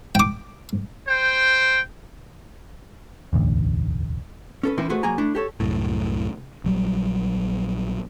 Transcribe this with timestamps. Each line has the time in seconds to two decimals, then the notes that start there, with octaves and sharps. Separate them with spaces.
0.15 G5 D6
1.08 C5 G5
3.33 E1 A1 D2
4.63 C#4 A4 B4
4.78 E3 C4 C#4 E4 A#4 B4
4.89 A3 F#4 G#4 B4 C5
5.03 C2 F#3 A#3 G#4 G#5 A#5
5.18 A3 D4 E4
5.35 G4 A4 C#5
5.60 C2 F#2 A2
6.64 A#1 F#3 G3